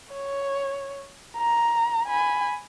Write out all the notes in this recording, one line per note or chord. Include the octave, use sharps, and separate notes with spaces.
C#5
A#5
G#5 B5